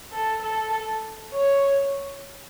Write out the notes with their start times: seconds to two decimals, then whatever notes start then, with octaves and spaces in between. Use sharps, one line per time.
0.11 A4
0.42 A4
1.33 C#5